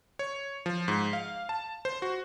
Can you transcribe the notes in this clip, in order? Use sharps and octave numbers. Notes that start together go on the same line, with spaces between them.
C#5
F3
G#2
F5
A5
C5
F#4